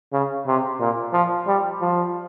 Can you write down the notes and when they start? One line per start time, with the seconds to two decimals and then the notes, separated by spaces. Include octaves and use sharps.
0.12 C#3
0.47 C3
0.80 A#2
1.13 F3
1.47 G3
1.81 F3